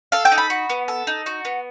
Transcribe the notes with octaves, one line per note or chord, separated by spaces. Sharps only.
A4 F5
G5
D#4
B5
F#4
B3
A4
D#4
F#4
B3